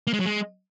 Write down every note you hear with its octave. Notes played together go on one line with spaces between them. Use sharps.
A#3
G#3
F#3
G#3